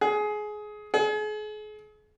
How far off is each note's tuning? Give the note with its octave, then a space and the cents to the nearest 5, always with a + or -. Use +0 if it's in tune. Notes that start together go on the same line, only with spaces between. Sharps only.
G#4 +20
G#4 +40